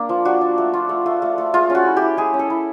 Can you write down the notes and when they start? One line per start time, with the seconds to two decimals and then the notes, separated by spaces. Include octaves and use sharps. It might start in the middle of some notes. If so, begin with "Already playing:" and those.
Already playing: A#3 D4
0.09 F3
0.25 D4 F#4
0.41 D4
0.58 A3
0.73 F4
0.89 A3
1.06 A3
1.22 A3
1.38 A3
1.54 G#3 F4
1.70 C#4
1.75 F#4
1.86 E4
1.97 G4
2.02 E4
2.17 G#3 G#4
2.34 C#4
2.39 A4
2.50 E4